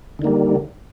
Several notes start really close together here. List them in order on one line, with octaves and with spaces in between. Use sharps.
D3 D#3 A#3 G3